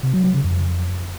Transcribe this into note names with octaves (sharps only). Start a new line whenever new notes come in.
C3
F#3
F#3
C#3
F2